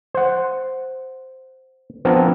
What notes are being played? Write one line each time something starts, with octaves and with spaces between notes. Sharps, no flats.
C5 F#5
F3 B3 C4 D4 A#4